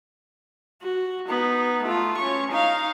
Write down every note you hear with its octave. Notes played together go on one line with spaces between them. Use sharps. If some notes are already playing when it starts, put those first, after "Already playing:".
F#4
B3 D#4
A3 F4
C#4 C#6
D#4 F5